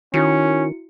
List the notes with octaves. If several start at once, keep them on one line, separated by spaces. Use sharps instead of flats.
D#3 C#4 E4 F#4 C#7